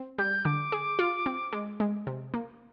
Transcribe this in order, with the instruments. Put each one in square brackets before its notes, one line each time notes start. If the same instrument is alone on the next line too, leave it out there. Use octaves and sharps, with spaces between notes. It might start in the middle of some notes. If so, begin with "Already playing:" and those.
Already playing: [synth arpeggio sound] C4
[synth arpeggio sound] G3 [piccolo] G6
[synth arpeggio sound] D3 [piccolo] D6
[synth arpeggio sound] G#4
F4
C4
G#3
G#3
C3
A#3